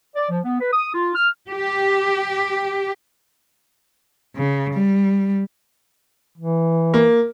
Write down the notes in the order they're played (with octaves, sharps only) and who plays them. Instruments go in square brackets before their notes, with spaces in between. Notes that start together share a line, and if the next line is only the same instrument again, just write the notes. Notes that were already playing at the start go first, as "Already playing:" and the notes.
[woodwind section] D5
F3
B3
B4
D#6
F4
F6
[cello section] G4
[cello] C#3
G3
[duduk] E3
[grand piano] A#3